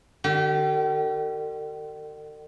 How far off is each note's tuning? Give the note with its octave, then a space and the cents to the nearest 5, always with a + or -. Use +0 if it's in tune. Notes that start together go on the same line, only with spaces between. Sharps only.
D3 +45 G4 -35